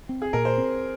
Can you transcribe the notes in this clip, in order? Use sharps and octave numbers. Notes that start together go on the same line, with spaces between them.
C4
G#4
A#2 A#4
C5
C4